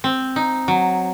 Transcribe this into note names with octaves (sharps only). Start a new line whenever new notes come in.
C4
D#4
F#3